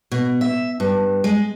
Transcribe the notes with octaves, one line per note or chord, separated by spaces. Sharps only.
B2
E5
G2
G#3